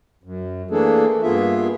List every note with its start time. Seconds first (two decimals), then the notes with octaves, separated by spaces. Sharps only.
0.24 F#2
0.71 E3 A3 A#3 D4 G#4 A4
1.23 G2 A#3 B3 F4 G#4 E5